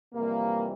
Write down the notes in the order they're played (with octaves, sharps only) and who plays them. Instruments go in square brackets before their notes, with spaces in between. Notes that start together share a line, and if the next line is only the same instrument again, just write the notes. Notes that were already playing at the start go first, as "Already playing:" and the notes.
[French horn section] F2 C3 E3 G3 A#3